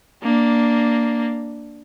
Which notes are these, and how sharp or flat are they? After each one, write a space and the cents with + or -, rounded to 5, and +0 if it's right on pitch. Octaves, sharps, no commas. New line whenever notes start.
A#3 +0 D4 +0